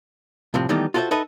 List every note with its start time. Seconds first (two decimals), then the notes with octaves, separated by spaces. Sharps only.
0.54 C2 A2 C3 F3 C4
0.69 D#3 E3 G3 A3 B3 D#4
0.94 F4 F#4 A4 A#4 C5 E5
1.11 D#4 A4 B4 D#5 E5